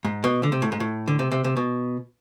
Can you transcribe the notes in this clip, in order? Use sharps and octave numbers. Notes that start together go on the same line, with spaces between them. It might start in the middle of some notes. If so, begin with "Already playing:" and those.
G#2
B2
D3
C3
A2
G#2
A2
D3
C3
C3
C3
B2